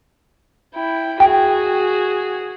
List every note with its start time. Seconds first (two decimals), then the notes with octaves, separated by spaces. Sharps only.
0.75 E4 G5
1.20 F#4 G#4 G5